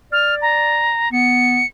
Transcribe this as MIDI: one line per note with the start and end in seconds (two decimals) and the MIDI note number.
0.12 0.93 74
0.12 0.35 89
0.42 1.11 82
1.12 1.60 59
1.12 1.67 97